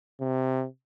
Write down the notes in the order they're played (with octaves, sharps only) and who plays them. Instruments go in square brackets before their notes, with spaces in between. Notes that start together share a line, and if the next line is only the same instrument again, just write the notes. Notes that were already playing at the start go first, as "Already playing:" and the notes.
[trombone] C3